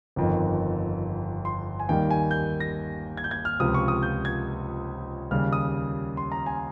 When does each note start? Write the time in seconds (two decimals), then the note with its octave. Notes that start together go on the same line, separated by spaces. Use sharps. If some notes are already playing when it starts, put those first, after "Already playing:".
0.16 G1 F2 D#3
1.45 C6
1.80 G#5
1.89 D#2 D#3 G3 G5
2.11 G#5
2.31 G6
2.60 A#6
3.17 G#6
3.24 G6
3.31 G#6
3.45 F6
3.60 C#2 C3 F3 D#6
3.74 C#6
3.88 D#6
4.03 G6
4.25 G#6
5.31 D#2 C#3 G3 F6
5.53 D#6
6.17 C6
6.32 A#5
6.46 G#5